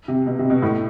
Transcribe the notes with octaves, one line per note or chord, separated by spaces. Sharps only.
C3
B2
C3
B2
A2